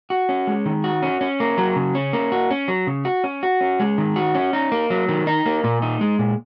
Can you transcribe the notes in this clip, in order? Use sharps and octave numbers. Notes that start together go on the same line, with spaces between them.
F#4
C#4
G#3
D#3
F#4
C#4
C#4
A#3
F#3
C#3
C#4
A#3
F#4
C#4
F#3
C#3
F#4
C#4
F#4
C#4
G#3
D#3
F#4
C#4
D#4
A#3
F#3
D#3
D#4
A#3
A#2
D#4
G#3
A#2